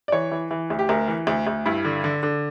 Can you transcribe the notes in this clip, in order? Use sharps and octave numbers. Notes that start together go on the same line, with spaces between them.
D5
E3 C#5
E3
E3
D2
G4
D2 A#4
E3
D2
D2
G2 E4
D3
D3
D3